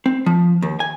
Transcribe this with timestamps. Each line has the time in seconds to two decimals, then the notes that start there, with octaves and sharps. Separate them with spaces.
0.06 C4
0.26 F3
0.62 D#2
0.80 G#5